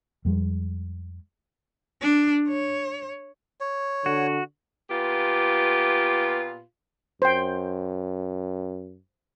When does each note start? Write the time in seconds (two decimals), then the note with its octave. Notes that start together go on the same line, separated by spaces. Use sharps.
0.25 F2 G3 G#3
2.01 D4
2.48 C#5
3.61 C#5
4.06 D3 F#4
4.90 A#2 B3 F4 G4
7.22 F#2 C5 G5